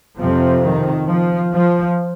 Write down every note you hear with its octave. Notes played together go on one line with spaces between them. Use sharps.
F2 C3 F3
D#3
F3
F3